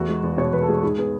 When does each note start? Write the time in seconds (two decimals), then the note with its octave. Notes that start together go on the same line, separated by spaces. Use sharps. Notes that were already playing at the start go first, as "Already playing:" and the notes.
Already playing: E2 A3 F#4
0.09 G#3
0.23 E2
0.38 B2 C#5
0.53 E2 B4
0.62 A4
0.68 G#3 G#4
0.83 G#2 G#4
0.98 B3 G#4